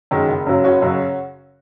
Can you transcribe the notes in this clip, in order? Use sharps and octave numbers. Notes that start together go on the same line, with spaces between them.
F#2 D#3 G#3
F#1
F#2 C#3 F#3
F#1 C#4 F#4
F#2 C#3 F#3